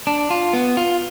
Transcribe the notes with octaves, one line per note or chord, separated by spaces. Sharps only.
D4
F4
B3
F4